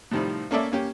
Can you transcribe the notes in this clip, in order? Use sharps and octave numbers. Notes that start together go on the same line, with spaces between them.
A2 C3 D#3 F3 G3
A#3 C#4 A4 D5 E5
A#3 C#4 G4